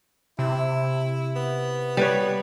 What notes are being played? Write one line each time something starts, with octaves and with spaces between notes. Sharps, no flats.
C3 E4
B3
G3 B4 C#5